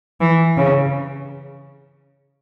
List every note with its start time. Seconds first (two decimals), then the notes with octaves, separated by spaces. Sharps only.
0.21 E3
0.57 C#3